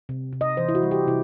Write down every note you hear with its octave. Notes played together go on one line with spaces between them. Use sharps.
C3
C3
D#5
E3 C5
E4
F#4
G3
G4
C3 E4